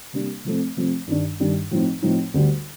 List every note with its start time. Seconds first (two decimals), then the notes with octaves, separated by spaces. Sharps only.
0.13 C3 G3 A#3 D4
0.45 C3 F3 A3 C4
0.77 C3 F3 A3 C4
1.07 G2 D#3 G3 D4
1.39 G2 D#3 G3 D4
1.71 A2 F3 C4 D#4
2.02 A2 F3 C4 D#4
2.34 D2 D3 G3